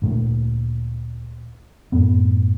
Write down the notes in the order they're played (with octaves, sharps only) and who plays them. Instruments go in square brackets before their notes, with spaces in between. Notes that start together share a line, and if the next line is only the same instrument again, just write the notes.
[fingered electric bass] D2 A#2 A3
F#2 A2 B3